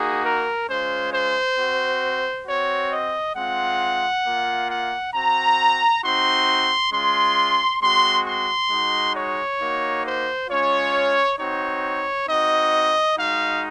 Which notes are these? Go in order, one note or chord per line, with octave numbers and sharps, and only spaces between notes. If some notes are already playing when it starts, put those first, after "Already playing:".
Already playing: A#3 D#4 F#4 G#4
A#4
G#3 C#4 F4 C5
C5
C4 F#4
C4 F#4 C#5
D#5
G#3 C4 F4 F#5
A#3 F4
F#5
C4 F#4 A#5
C4 D#4 F#4 C6
G#3 C#4 F4 C6
G#3 C4 F#4 C6
C6
G#3 D#4 F#4
C#5
A#3 D#4 F#4
C5
G#3 C#4 F4 C#5
C4 D#4 F#4 C#5
C4 D#4 F#4 D#5
G#3 D#4 F#4 F5